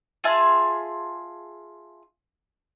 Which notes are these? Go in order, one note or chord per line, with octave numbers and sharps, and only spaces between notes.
F4 G#4 E5 A5